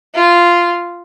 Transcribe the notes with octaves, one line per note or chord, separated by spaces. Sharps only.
F4